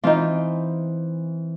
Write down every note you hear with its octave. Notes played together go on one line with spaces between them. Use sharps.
E3 C4 D#4 F4